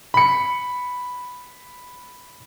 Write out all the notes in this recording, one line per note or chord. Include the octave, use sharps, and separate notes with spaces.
B5 C#7